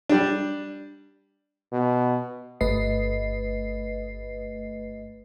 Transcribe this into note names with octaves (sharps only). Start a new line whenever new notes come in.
G3 D4
B2
G1 A3 B4 D#5 C7